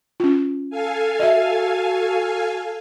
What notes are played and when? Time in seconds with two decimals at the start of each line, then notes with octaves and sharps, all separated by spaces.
0.20 C#4 F4
0.70 A4 F5 G#5
1.20 F#4 D#5 E5